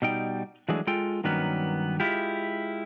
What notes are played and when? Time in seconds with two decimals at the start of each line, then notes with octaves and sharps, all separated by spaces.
0.02 B2 G3 D#4 G5
0.69 E3 F#3 G#3 A3 D4 G#4
0.87 G#3 F4 A4 G5
1.24 G2 D#3 F#3 A#3 B3 C#4
2.00 G#3 E4 F4 G4